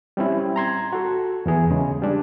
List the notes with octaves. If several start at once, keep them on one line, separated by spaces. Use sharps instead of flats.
G3 C4 C#4 E4
A#5 C6 G#6
F#4 A4
E2 E3 G#4
C#3 G#3
G3 D4